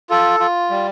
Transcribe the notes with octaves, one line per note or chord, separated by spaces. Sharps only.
F4 A4
F4
G3